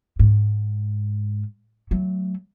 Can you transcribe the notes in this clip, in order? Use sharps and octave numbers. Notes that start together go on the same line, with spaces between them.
G#2
F#3 A3